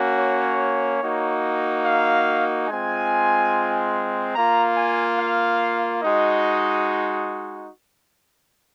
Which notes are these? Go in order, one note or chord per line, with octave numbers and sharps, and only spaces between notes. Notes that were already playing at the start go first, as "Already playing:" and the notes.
Already playing: A#3 C#4 F#4
C#5
A#3 D#4 F#4
F5
G#3 C4 F4 G#5
A#3 F4 A#5
G#5
F5
G#3 D#4 F#4 D#5